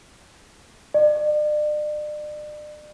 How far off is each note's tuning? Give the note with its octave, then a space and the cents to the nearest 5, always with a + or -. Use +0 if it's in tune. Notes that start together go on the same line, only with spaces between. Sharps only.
D5 +40